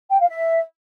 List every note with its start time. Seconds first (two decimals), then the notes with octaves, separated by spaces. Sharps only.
0.11 G5
0.20 F5
0.29 E5